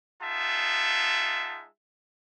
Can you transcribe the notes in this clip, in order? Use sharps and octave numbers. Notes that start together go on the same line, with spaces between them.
G#3 D#4 F4 E5 F#5 A5